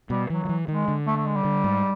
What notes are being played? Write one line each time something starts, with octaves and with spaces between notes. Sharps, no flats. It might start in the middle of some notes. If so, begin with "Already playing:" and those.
B2 G3
E3 F#3
F3
E3
D#3 G#3
D3
A3
A3
G#3
G3
D3
G#2